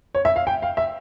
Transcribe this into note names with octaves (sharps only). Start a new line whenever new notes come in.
C#5
E5
F5
G5
F5
E5